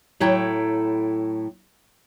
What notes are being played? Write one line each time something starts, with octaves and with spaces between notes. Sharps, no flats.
A2 F#3 E4 A4 G5 A#5